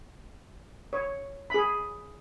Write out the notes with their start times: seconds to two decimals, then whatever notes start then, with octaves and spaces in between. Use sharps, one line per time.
0.93 C#5
1.50 G#4 B5